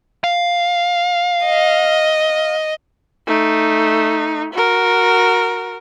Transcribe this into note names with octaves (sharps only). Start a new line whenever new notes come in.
F5
D#5
A3 D#4
F#4 A#4